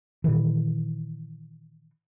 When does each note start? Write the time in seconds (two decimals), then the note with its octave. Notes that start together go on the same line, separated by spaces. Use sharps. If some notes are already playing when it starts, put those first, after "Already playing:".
0.24 A#2 D#3 E3